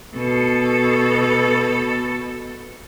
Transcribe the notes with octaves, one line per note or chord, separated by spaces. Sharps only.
B2 A4